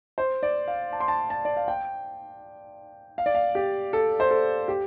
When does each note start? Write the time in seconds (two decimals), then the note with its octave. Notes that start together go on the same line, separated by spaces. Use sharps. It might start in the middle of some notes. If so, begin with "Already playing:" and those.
0.18 C5
0.43 D5
0.68 F5
0.93 A5
1.00 C6
1.08 A5
1.30 A5
1.45 D5
1.57 F5
1.68 G5
3.18 F5
3.26 D5
3.35 F5
3.55 G4
3.93 A4
4.20 C5
4.31 A4
4.68 G4